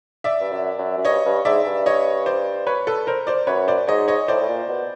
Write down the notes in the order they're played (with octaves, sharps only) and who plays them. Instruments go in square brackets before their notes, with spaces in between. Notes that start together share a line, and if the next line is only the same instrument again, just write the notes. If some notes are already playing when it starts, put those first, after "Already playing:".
[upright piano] D5 E5
[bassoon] G2
F#2
F#2
F#2
[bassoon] G2 [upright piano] C#5 D#5
[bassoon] G2
[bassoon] G#2 [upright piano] D5 E5
[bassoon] G2
[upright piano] C#5 D#5
C5 D5
B4 C#5
A4 B4
A#4 C5
C5 D5
[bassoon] F#2 [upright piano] B4 C#5
[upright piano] C5 D5
[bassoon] G#2 [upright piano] C#5 D#5
[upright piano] C#5 D#5
[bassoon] A2 [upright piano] C5 D5
[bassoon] A2
A#2
B2